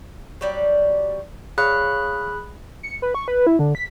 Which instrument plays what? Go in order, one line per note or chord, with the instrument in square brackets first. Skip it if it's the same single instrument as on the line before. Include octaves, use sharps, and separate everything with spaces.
[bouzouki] F#3 G3 D5
[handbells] G#4 B5 F#6 [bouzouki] C#5 F5
[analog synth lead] C#7
B4
C#6
B4
E4
D3
B6